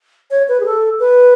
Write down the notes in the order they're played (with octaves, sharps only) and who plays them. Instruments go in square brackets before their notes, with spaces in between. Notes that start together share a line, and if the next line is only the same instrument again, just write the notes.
[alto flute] C#5
B4
G#4
A4
B4